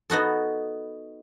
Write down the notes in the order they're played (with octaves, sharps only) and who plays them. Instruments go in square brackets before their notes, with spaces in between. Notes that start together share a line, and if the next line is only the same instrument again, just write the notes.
[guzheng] B3 D#4 F#4 A4